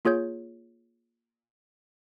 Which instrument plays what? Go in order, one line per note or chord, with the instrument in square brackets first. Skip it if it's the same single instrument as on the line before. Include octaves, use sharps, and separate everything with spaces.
[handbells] A#3 F4 G#4 C#5 G6